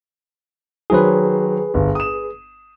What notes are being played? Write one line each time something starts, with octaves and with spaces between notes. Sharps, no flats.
D#3 F#3 G#4 B4 C5
G1
D#6 E7